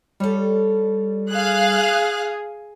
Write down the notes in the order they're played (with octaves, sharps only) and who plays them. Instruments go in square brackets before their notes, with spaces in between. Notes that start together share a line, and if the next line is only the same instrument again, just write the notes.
[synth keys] G3 [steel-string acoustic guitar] A4 C#5
[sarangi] G#4 [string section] F5 F#6